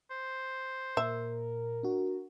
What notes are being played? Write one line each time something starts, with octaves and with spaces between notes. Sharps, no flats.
C5
A#2 A#4 E5
D4 F#4